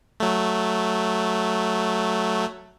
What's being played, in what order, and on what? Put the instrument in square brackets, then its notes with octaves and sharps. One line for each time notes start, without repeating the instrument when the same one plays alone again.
[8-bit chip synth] F#3 A3